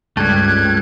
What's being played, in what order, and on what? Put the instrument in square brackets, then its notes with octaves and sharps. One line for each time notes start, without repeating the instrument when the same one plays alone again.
[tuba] C#2 [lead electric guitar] G2 [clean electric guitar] G3 A3 [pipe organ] F#6 G#6